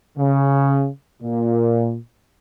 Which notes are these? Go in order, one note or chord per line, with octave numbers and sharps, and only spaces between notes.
C#3
A#2